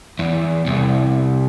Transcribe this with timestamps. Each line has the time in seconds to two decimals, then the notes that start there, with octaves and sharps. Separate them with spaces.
0.19 E2
0.67 C2